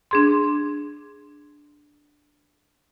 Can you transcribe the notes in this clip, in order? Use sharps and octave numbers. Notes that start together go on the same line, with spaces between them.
D4 G#4 C6